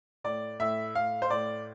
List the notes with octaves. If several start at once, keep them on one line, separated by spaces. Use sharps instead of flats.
A2 D5
A2 E5
A2 F5
C5
A2 D5